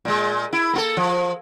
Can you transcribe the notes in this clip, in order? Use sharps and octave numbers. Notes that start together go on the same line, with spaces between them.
A#2 G#3
E4
A#3 F4 A4
F3